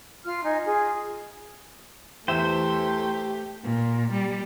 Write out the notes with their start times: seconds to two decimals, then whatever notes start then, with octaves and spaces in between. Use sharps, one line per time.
0.25 F4 F6
0.45 D#4 D#5 G#5
0.64 F4 G#4 G#5
2.28 E2 A3 G4 C5 E5 E7
3.64 A#2
4.12 G3